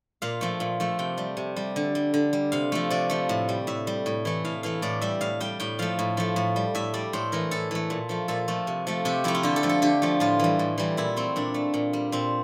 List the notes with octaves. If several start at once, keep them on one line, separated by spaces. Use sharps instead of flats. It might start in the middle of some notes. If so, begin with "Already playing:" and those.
A#2 F5
F3 A3
A#2
F3 A3
C3 G5
G3
C3
G3
D3
G3
D3
G3
C3 F5
F3 A3
C3 D5
F3 A3
A2
G3
A2 E5
G3
A2
E3 A3
A2 F5
E3 A3 F5
A2 D5
G3 E5
A2 F5
G3 G5
A2 G5
F3 A3 F5
A2
F3 A3
A2
G3
A2 E5
G3 D5
A2 C5
E3 A3 A#4
A2 A4
E3 A3
A#2
F3 A3
A#2 A4
F3 A3
C3
F3 A3
C3 G4
F3 A3 E4
F4
D3 G4
A4
F3 A3
A4
D3 G4
F3 A3
A2 F4
E3 G3
A2
E3 G3
A#2 E4
A3 C4
A#2 D4
A3
A#2
G3
A#2 C4